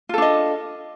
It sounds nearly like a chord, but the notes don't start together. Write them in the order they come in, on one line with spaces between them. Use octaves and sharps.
F4 A4 D4 D#5